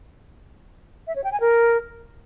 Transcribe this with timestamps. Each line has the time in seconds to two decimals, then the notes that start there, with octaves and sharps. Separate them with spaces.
1.07 E5
1.16 C#5
1.24 G5
1.32 G#5
1.41 A#4